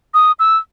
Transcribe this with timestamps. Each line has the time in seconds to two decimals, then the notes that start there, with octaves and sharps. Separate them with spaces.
0.14 D#6
0.39 E6